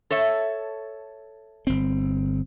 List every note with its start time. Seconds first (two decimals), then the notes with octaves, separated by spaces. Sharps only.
0.11 A4 C#5 E5
1.67 G1 C4